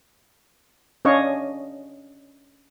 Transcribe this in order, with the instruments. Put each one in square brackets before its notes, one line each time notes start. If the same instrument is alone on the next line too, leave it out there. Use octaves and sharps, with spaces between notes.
[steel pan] C#4 D4 C#5 D#5 F5 C#6